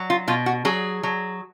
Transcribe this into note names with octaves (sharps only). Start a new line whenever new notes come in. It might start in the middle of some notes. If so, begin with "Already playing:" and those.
Already playing: F#3
F4
B2 F4
F#4
F#3 G#4
F#3